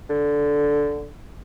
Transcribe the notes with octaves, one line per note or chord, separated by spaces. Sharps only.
D3